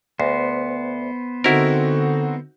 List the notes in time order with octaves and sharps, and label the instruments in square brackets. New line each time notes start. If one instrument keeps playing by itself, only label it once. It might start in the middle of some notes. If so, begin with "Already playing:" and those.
[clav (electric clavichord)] D2 [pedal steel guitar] B3 C5
[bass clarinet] D3 [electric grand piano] C4 D#4 F#4 [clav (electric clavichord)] E4 A#4